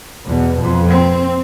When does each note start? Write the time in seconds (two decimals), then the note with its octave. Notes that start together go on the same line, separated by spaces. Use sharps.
0.25 E2 B2
0.58 F2
0.89 C4